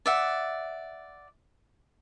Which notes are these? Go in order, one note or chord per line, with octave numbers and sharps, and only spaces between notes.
D5 E5 F#5